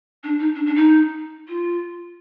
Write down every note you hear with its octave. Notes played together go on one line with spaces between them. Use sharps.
D4
D#4
D4
D4
D#4
F4